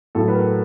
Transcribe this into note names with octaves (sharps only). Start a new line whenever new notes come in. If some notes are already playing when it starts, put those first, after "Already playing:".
A2 F#3 A4
B4
A#4